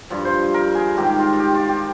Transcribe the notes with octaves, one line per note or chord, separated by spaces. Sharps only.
G2 F3
C5
A#4
G#4
G#2 D#3 G4
F4
F4
G4
F4
G4